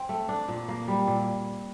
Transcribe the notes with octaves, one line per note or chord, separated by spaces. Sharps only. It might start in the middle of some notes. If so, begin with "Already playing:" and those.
Already playing: C4
A3
D4
A#2
A#3
G3
A#2